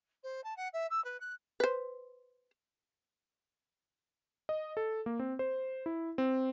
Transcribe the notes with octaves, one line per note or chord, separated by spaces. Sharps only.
C5
A5
F#5
E5
E6
B4
F#6
B4 C5
D#5
A4
A#3
C4
C5
E4
C4